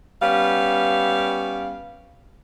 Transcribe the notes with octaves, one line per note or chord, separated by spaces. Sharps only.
G3 B3 C#4 F5